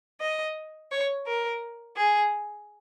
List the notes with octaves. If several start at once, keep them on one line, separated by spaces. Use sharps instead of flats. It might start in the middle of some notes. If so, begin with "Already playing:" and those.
D#5
C#5
A#4
G#4